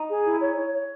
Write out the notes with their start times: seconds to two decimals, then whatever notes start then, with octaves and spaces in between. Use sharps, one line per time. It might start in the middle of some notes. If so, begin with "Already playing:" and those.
Already playing: D#4
0.09 G#4
0.25 E4
0.41 C#5
0.57 C#5
0.73 C#5